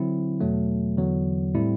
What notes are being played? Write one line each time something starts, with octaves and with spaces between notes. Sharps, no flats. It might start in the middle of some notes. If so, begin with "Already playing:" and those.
Already playing: D3 F#3 C4 E4
E2 B2 F#3 A3
E2 D3 F#3
A2 G3 C4 E4